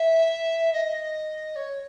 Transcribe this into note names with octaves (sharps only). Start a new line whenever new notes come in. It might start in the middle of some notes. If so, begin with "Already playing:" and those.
Already playing: E5
D#5
C#5